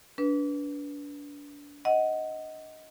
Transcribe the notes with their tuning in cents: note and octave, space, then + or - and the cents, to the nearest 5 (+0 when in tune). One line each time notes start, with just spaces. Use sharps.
D4 -25 B4 -10
D#5 +15 F#5 +5